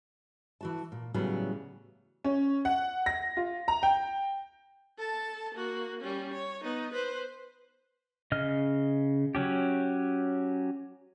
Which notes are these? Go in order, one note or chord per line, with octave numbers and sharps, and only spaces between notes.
E3 F#4 A5
A#2
A2 C#3 E3 F#3 G3 B3
C#4
F#5
A#6
F4
A#5
G5
A4 A5
A#3 F#4
G3 C#4
C#5
B3 D#4
B4 C5
C#3 D#5 F6
F#3 C#4 G4